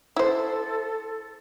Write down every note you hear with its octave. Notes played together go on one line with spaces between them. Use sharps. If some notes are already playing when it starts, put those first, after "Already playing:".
E4 A4 C5